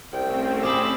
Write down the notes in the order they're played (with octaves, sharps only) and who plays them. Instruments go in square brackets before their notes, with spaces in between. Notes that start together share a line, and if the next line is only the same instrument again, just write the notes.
[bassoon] C2 [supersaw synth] A3 C4 C#4 [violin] G5
[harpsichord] G4 G#4 D6 [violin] B5 E6